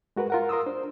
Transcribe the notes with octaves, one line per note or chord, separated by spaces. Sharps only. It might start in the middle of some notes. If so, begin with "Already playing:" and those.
G#3 F#4 A#4 B4
F4 A#4 F#5
A#4 C6 D#6 E6
D4 C5